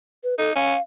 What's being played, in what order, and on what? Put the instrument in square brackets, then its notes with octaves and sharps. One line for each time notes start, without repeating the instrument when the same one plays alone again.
[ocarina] B4
[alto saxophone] D#4 [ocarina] A4
[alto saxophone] C#4 [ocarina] F5